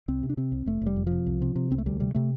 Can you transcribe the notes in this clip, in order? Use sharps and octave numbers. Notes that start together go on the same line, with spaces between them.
C2 C4
C3
D4
C3 C4
C2
F1 A3
F1 G3
F2
C3 F3
C2
C3
C3
C2 C4
A3
D2 G3
C3 G3
C3 A3